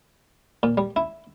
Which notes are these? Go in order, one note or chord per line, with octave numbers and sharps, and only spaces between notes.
A#2
G3
E4